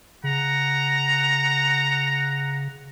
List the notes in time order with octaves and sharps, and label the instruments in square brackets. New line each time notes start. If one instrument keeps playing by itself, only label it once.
[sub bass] C#3 [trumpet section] F#5 A#5